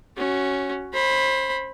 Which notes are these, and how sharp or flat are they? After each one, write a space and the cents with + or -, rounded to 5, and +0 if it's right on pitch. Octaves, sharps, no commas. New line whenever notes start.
C#4 +0 F#4 +15
C5 +25 B5 +0